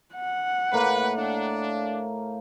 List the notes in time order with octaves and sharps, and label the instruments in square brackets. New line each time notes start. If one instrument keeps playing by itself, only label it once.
[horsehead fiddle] F#5
[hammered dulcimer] A2 A#3 G5 [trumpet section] B4
[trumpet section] D4 [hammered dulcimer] F5